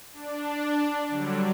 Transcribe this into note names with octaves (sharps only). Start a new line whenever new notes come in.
D4
D3 F#3 G3